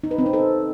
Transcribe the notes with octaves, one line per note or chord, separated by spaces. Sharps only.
D#4
B4
C4
D#4
A4